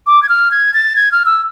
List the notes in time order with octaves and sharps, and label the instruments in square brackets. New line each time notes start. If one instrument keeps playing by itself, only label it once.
[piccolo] D6
G#6
F6
G#6
A6
G#6
F6
E6